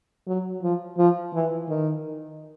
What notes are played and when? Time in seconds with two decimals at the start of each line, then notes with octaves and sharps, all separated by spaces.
0.27 F#3
0.62 F3
0.98 F3
1.34 E3
1.69 D#3